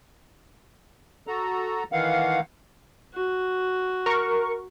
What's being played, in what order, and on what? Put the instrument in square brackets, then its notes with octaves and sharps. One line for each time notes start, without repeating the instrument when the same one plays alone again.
[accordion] F#4 A4 A#5
D#3 E3 F5 F#5
[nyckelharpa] F#4
[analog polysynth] A#4 C#6